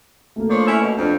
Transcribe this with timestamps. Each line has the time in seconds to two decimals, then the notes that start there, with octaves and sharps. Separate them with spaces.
0.36 A3 A#3
0.50 F3 D4 C#5
0.66 C#4 E4
0.81 B2
0.97 F2 D4